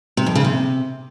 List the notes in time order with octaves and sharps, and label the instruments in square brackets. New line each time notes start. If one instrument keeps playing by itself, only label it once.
[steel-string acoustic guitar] C3
F2
C#3
C3